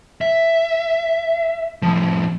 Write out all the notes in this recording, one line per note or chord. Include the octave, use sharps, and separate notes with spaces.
E5
A2 F3